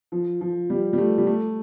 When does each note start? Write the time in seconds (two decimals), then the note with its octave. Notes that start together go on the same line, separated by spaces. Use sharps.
0.12 F3
0.41 F3
0.70 G3
0.93 G3
0.98 A3
1.18 G3
1.27 A3